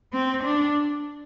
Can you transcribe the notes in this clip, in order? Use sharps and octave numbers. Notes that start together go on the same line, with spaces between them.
C4
D4